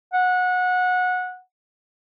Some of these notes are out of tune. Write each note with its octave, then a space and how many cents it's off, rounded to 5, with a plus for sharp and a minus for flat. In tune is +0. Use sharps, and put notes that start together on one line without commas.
F#5 -20